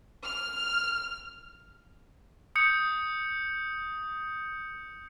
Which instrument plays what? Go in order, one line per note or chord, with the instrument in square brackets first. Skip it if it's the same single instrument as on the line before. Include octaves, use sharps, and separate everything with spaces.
[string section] F6
[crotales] D#6 G6 C#7